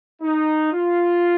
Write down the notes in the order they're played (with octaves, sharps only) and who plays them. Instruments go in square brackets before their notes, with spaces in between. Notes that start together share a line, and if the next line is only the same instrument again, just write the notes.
[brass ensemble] D#4
F4